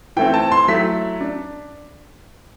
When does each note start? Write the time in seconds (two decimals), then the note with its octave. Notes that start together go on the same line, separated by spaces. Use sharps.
0.17 E3 A3 C4 G5
0.34 A5
0.52 C6
0.68 F#3 A3 E4 B6
1.21 D4